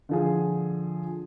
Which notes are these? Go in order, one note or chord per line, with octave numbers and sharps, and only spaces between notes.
D3 F3 G#4